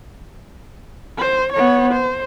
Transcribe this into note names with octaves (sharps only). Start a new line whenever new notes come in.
C5
B3 C#5
C5